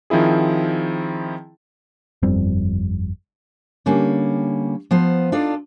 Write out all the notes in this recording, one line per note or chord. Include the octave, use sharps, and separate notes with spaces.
D#3 F3 C4 E4 G#4
G1 F2 G3 C4
D3 G3 A#3 C#4
F3 B3 C5
D4 D#4 F4 A4 D5